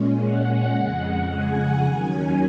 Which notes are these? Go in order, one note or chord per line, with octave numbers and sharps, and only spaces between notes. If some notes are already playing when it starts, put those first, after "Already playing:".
Already playing: A#2 G#3 C#4
F#5
F2 C#3 G#3
G#5
D#2 D#3 F#3 C#4